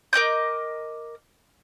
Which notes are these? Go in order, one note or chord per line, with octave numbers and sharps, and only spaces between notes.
A#4 D#5 D6 G6